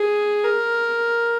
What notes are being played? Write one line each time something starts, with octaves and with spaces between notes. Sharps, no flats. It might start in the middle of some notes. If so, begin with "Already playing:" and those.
Already playing: G#4
A#4